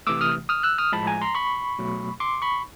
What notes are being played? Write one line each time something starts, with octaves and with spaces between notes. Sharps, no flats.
C3 E3 A3 D6 E6
D#6 F6
D#6 F6
E6 F#6
D#6 F6
A2 F3 G#3 A5 B5
G#5 A#5
A#5 C6
B5 C#6
B2 F#3 A3
C6 D6
B5 C#6